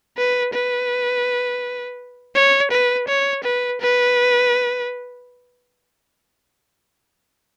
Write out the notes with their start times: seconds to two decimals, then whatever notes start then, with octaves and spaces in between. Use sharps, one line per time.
0.18 B4
0.54 B4
2.36 C#5
2.71 B4
3.08 C#5
3.44 B4
3.81 B4